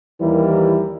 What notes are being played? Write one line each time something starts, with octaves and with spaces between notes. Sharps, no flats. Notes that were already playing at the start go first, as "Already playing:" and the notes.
D#2 E3 G3 E4 A#4